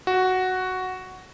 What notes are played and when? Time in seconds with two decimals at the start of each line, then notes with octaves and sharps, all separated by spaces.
0.07 F#4